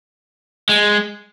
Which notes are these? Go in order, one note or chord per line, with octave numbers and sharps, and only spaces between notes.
G#3